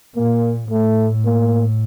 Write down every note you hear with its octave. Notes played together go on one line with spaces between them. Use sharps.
A#2 A#3
A2 A3
A#3